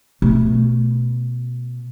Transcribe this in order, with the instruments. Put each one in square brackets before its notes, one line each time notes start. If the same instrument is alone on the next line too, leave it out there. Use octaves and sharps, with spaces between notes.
[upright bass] B2 A3